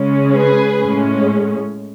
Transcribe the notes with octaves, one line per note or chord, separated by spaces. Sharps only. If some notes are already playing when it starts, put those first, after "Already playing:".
Already playing: C#3 G#3 C#4
G#4 B4
A2 G#3 C#4